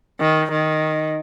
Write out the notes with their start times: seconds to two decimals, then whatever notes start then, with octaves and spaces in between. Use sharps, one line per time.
0.21 D#3
0.51 D#3